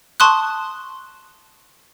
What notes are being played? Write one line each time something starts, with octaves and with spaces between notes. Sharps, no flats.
A5 C6 C#6 D#6 F#6